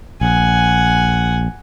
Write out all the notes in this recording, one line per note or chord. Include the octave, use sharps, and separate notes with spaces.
A#1 F#5 G#5